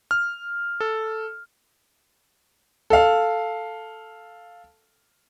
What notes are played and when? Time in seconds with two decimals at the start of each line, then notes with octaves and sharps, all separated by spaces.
0.11 F6
0.81 A4
2.90 A4 F5